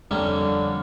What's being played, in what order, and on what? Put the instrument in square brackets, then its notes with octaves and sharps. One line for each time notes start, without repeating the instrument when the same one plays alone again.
[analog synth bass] F2 [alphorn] D3 [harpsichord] G3 A#3 C#4